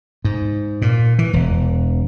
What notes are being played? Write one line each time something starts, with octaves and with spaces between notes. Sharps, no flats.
G#2
A#2
E3
E1